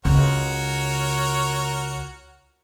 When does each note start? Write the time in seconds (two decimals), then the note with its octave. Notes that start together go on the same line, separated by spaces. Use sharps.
0.05 C#2 F#4 A#4 C#5